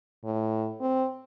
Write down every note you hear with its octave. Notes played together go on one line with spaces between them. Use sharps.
A2
C4